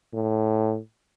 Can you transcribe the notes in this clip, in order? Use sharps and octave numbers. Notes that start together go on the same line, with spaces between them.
A2